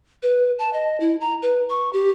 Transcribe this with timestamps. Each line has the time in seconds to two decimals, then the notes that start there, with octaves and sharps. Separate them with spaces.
0.23 B4
0.59 A5
0.73 D#5
1.00 E4
1.21 A#5
1.42 B4
1.70 C#6
1.93 G4